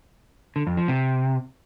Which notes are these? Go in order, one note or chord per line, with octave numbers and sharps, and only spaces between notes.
D3
F2
F3
C3